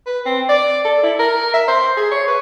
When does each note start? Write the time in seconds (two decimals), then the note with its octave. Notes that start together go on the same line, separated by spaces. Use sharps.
0.06 B4
0.26 C4
0.49 D5
0.85 A4
1.03 E4
1.19 A#4
1.54 E5
1.68 C5
1.97 G#4
2.12 C#5
2.28 B4